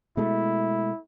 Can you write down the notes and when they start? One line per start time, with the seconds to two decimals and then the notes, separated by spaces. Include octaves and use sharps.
0.17 B2 G#3 A3 E4